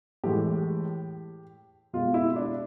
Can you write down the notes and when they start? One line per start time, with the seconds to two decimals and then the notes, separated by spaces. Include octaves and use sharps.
0.24 A2 E3 G#3 G4
1.93 B2 G#3 F4
2.14 E4
2.36 D4